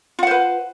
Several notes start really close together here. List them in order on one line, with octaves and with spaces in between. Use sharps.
F4 F#5 C5 B4